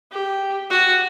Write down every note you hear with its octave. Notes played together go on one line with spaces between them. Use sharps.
G4
F#4